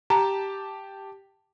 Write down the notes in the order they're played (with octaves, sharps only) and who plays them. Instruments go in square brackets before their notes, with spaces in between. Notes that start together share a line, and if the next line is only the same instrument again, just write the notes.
[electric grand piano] G4 A5 [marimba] A#5